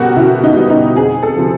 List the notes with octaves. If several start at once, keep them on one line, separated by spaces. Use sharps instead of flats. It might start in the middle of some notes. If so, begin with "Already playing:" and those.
Already playing: B2 G3 B3 F#4 G4 A4 A#4
B2 E4
D#4
G3 B3
D#4
F2 G#4
A4
C3 F3